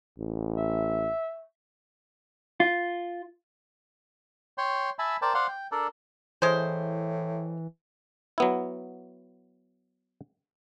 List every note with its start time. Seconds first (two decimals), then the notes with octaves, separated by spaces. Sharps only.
0.19 A1
0.57 E5
2.60 F4
4.58 C#5 G5 C6
4.99 E5 G#5 A5 B5
5.22 A#4 C5 D5 G5 A5
5.34 C5 D5 F5 F#5 C6
5.48 G5
5.72 D4 A4 A#4 D5
6.42 A2 E3 G#3 C5
8.38 F#3 B3 E4